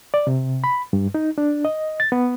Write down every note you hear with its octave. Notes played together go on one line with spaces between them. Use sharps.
D5
C3
B5
G2
D#4
D4
D#5
A6
B3